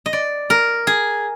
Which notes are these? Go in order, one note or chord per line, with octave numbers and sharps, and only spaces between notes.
D#5
D5
A#4
G#4